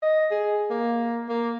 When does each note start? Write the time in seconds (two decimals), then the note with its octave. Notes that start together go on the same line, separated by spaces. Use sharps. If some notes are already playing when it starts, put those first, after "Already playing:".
0.02 D#5
0.31 G#4
0.70 A#3
1.28 A#3